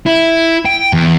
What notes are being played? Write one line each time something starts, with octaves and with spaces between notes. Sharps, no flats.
E4
G5
E2